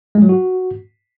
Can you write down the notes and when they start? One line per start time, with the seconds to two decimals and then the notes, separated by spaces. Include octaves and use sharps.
0.15 G#3
0.22 F#3
0.29 F#4